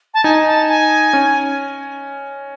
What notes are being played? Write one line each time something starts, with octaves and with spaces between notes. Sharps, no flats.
A5
D#4 G#5
A5
G#5
C#4